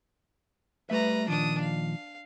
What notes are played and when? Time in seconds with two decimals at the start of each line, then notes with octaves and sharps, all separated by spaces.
0.90 G3 A3 B4 E5 A#5
1.28 A#2 D#3 F3 D4 D#6
1.61 F5